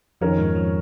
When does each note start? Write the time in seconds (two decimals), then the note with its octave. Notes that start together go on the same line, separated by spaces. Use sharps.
0.21 F2 D#3 F3 C#4 A#4 C#5
0.38 G#2 G#3
0.55 F2 F3